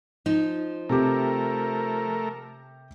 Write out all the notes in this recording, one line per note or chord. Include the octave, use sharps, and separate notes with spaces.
F3 D#4
C3 A3 G4 A#4